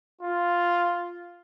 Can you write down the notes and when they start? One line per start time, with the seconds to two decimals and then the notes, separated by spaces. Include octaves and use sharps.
0.21 F4